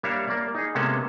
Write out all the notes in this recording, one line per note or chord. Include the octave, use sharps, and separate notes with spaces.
G3 A#3 D4 C#5 E5 F5
A#3 D5
D#4 G#4
C3 G#3 A#3 B3 C#4 A4